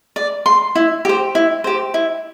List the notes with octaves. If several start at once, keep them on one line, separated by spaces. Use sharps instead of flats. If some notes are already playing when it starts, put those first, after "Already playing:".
D5
C6
E4
G4 C5
E4
G4 C5
E4